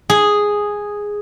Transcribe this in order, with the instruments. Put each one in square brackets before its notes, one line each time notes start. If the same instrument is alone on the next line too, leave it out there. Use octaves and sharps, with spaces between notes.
[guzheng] G#4